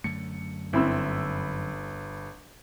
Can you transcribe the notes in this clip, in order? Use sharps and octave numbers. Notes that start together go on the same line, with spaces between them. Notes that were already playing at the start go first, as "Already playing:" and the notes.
F#2 D3 A3 C#7
G1 C4 E4 B5 E6